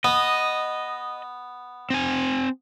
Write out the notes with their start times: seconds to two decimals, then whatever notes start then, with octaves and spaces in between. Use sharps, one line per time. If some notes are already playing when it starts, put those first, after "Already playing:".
0.04 B3 D#5
1.90 C4 G#5